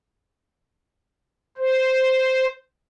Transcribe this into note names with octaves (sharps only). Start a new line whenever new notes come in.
C5